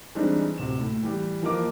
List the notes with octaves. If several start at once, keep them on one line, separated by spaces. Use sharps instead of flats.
E3 G3 G#3 C4 D4 D#4
D1 C3 E7
A2
E3 G3 G4
E3 F3 A#3 A#4 D#5 D6